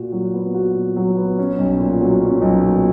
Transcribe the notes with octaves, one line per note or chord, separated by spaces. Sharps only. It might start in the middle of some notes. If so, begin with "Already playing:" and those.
Already playing: A#2 F#4
F#3
B3
F#4
A#2
F#3
B3
C#4
B1
A#2
F#3
C#4
B1
A#2